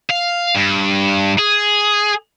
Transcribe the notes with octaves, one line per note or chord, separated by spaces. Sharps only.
F5
G2
G#4